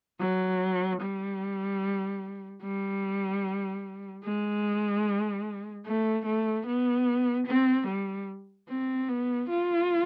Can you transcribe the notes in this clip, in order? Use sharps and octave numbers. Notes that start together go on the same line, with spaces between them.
F#3
G3
G3
G#3
A3
A3
B3
C4
G3
C4
B3
F4